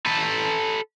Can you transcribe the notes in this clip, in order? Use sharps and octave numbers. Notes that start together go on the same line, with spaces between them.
A4 B4